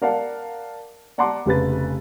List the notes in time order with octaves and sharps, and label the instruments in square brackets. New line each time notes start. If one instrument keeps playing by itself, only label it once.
[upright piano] A#4 D5 F5 F#5 A5
D5 F#5 A5 A#5 C6 D6
F1 C#3 B4 A6